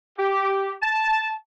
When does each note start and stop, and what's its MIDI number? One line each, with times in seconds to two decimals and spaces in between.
0.18 0.72 67
0.82 1.31 81